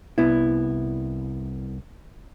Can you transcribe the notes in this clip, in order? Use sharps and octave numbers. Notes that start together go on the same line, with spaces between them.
C2 B3 E4